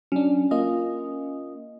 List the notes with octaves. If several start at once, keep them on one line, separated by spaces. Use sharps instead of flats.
F#3 C#4 D4
A#3 F4 D#5